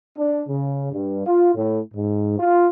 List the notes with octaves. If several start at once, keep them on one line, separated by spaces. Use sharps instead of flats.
D4
C#3
G2
F4
A2
G#2
F4